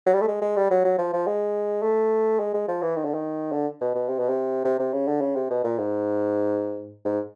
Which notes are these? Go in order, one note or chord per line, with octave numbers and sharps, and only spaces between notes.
F#3
G3
A3
G#3
G#3
G3
F#3
F#3
F3
F3
G#3
A3
G#3
G#3
F3
E3
D#3
D3
D#3
D3
B2
B2
C3
B2
C3
C3
C3
C#3
D3
C#3
C3
B2
A#2
G#2
G#2